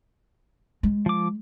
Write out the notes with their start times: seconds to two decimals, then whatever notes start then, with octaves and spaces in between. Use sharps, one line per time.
0.83 G#3
1.06 F3 D6